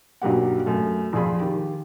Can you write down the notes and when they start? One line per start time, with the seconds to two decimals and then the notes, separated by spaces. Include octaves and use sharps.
0.22 B1 G2 F#3 A#3 G4 F#5
0.66 F#2 A3
1.13 A#1 F2 F4 G#4 B5
1.40 D#3 G4